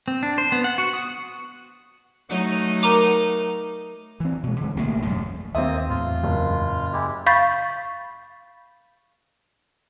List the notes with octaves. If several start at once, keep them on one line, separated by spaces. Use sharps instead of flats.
C4
D4
C5
B3
F#5
F#4
D#6
F#3 A3 D#4
A#4 A#5 D6
E3 C4
B2 G#3
D3 G#3
A1 G3 A3 A#3
E1 F#2 G#3 A3
D#2 A#3 C4 F4 E5 D#6
E2 A2 F4
F#1
G#3 E4 G4
F5 B5 C#6 G6 A6 B6